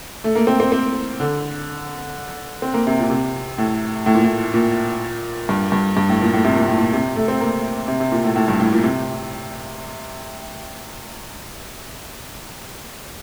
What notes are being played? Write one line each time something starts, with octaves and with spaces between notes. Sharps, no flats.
A3
A#3
C4
C4
C4
D3
C4
A#3
C3
A#2
C3
A2
A2
A#2
A2
A#2
G2
G2
G2
A2
A#2
A2
C3
A#2
A2
A#2
C3
A3
C4
A#3
C3
C3
A#2
A2
A2
G2
A2
A#2
C3